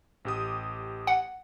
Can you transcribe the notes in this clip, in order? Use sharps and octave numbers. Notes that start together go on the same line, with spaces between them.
A1 G4 D#6
F#5